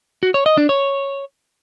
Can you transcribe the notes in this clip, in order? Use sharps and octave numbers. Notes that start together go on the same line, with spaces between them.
F#4
C#5
D#5
D4
C#5